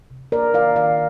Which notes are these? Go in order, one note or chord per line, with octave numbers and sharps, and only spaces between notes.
C3
A#3 A#4 D5
D#3 D5 F5
D#3 D5 F5